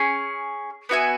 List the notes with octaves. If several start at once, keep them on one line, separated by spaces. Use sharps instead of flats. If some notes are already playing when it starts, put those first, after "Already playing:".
Already playing: C#4 G#4
B3 F#4 E5 G#5